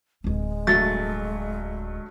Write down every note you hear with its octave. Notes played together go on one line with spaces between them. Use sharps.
D1 G#3 C4
G2 F#3 A3 A6